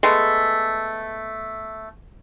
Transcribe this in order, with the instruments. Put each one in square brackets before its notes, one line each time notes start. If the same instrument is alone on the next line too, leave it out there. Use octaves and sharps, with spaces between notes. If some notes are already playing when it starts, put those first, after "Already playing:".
[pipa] G#3 A3 B3